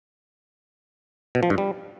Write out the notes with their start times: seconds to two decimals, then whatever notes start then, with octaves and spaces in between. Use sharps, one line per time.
1.35 B2
1.43 F3
1.50 G2
1.58 G3